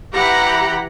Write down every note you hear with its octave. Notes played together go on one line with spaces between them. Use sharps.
E3 G4 F#5 A#5 B5